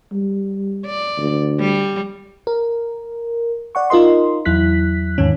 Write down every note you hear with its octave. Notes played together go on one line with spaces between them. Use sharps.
G3
D5
D2
G3
A#4
D5 F#5 C#6
D#4 F4 A#4 D#5 C6
E2 F#3 E4 F#6 B6
E2 G#2 D#3 C#4